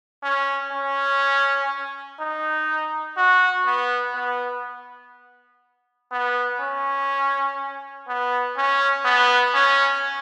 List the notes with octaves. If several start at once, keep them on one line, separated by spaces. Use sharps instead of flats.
C#4
C#4
D#4
F#4
B3
B3
B3
C#4
B3
C#4
B3
C#4